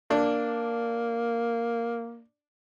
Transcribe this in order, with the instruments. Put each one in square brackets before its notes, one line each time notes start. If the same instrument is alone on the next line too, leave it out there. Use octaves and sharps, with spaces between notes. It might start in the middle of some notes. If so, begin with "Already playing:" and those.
[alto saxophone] A#3 [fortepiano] D4